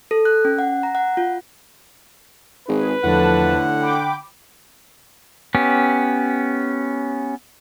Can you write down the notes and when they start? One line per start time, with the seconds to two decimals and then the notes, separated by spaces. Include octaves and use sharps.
0.11 A4
0.25 F#6
0.45 C#4
0.59 F#5
0.83 A#5
0.95 F#5
1.17 F4
2.68 G#1 G#4 B4
3.03 E2 A2 D3 F3 F#5 A5
3.81 G5 B5 D6
5.55 B3 C#4 G4